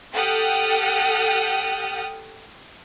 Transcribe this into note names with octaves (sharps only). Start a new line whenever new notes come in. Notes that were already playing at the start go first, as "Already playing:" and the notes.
G4 A4 F#5 G5 D#6 F6